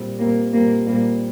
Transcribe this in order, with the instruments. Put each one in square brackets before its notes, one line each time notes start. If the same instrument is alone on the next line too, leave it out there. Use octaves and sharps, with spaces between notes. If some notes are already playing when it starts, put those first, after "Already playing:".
Already playing: [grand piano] A#2 G3 C4
[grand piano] A#2 G3 C4 [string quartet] A#3
[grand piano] A#2 G3 C4 [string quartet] A#3
[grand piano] A#2 G3 C4 [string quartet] A#3